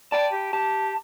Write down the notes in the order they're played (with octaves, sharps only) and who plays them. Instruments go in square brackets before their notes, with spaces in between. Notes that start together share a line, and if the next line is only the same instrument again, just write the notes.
[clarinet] D5 [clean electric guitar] G5 A5
[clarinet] G4
[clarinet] G4 [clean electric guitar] A5